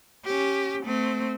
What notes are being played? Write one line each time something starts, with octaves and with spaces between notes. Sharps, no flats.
C#4 G4
A3 C4